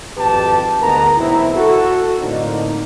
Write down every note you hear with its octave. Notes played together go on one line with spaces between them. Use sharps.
G#1 F2 G4 B4 A5
D2 G#2 B3 A#4 A#5
B1 E2 C4 E4
F#4 A4
A2 D3 A#3 C4 D#4